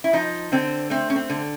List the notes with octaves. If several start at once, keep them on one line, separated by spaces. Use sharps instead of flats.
E4
F3 D#4
D3 C4
A3 C4
C#4
C4
D3